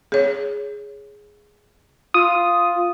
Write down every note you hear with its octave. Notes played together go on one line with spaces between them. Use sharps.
G#4 C#5
F4 D#6